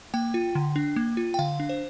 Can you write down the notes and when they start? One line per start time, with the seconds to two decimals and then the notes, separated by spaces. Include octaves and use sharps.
0.14 A#3 G5
0.34 F4
0.55 D3
0.76 D4
0.96 A#3
1.17 F4
1.34 G5
1.39 D3 F5
1.60 D4
1.69 C5